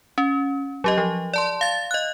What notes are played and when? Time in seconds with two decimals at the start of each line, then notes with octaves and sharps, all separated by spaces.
0.18 C#4
0.84 F#3 G4 D#5
0.98 F3
1.34 D5 A5 C6
1.61 F5 A6
1.91 D#5 F#6